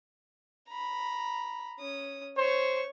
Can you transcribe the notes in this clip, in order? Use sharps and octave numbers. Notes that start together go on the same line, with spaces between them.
A#5 B5
C#4 D#6
C5 C#5 C#6